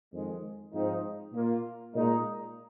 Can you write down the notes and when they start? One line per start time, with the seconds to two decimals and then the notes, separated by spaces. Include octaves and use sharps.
0.12 F2 D#3 G#3
0.73 G#2 F3 C4 D#4
1.33 A#2 A#3 F4
1.93 A#2 G#3 D#4